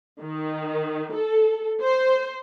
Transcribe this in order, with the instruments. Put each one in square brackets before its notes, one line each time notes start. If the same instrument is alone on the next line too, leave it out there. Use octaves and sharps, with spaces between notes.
[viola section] D#3
A4
C5